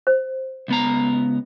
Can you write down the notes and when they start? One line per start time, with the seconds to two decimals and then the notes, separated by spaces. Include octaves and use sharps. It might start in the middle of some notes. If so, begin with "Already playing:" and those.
0.07 C5
0.68 C#2 B3 A#5